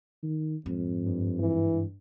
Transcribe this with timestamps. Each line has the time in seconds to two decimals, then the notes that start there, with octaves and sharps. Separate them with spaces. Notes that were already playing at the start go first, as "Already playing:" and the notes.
0.23 D#3
0.66 F2 G#2
1.05 G2
1.40 E3